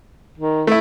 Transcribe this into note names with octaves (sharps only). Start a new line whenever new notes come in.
D#3
A3 E4